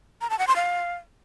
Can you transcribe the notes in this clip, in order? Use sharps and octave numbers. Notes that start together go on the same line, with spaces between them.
A#5
A5
F#5
C6
F5